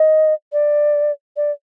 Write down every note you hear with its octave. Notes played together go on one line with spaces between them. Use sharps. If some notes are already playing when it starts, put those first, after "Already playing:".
Already playing: D#5
D5
D5